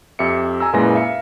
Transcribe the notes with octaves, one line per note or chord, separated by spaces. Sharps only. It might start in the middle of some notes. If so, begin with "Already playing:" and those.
F2 G4 E5 C#7
G#5 A#5 E6
F#2 A#2 G#3 E4 B4 A#6
E5 F5 C#7